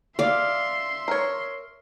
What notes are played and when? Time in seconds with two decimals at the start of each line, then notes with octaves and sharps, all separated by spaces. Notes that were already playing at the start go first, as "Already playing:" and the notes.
0.19 D5 E5 F5 C6
1.08 A#4 C#5